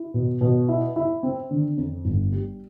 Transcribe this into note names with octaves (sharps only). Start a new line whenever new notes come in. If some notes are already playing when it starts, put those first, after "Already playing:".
Already playing: E4
B2
B2
E4
E4
C4
D3
F2
G1
G3